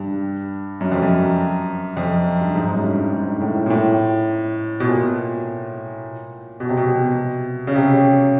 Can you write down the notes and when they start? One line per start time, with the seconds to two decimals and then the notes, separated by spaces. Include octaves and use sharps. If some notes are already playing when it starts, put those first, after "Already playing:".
Already playing: G2
0.81 F#2
0.92 F2
1.02 F#2
1.97 F2
2.40 G2
2.55 G#2
2.73 F#2
2.83 G2
3.13 G#2
3.41 A2
3.66 A#2
3.70 A2
4.80 B2
4.86 A#2
6.60 B2
6.69 C3
6.77 B2
7.67 C#3
7.76 C3